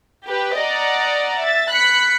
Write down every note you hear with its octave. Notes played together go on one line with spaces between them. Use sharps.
G4 B4
D5 D#5 F#5 A#5
E5 A6
B5 F#6 B6 C#7